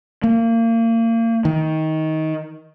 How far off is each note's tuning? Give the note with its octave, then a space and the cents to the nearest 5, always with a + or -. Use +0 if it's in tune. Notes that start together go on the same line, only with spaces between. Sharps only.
A#3 -30
D#3 +20